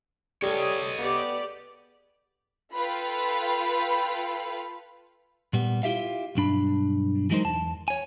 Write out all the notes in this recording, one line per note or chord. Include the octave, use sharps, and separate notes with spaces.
G3 G#4 A4 C#5 D#5
B3 G4 D5
F4 A4 B4 F5 G5 B5
A#2 G3 B3
E4 F4 G4 E5 F5
B1 G2 D4 B5
E3 F#3 G#3 D#4 A#4 C5
E2 A5
C#5 G#5